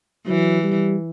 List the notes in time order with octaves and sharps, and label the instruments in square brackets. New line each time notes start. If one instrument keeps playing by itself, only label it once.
[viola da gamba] E3 [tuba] F#3
[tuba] G3